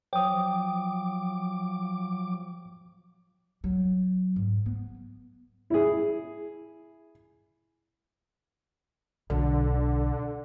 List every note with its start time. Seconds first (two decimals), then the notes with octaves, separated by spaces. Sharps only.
0.13 F3 F#3 G5 D6 D#6
3.64 F#3
4.36 G#2
4.66 B3
5.70 E4 G#4
9.30 B1 D3